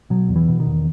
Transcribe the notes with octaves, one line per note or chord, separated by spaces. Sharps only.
B2 F#3
E2
E3
B2
D#3
E2